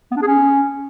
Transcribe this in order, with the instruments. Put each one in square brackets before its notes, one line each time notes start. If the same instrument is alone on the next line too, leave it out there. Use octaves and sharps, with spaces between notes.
[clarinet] B3
D4
G#4
C#4